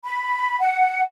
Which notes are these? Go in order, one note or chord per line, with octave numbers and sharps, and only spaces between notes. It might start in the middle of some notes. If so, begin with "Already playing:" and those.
B5
F#5